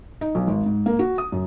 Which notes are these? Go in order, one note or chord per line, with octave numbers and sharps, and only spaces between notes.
D#4
B1
G#1
G#2
A#3
F#4
D#6
F#2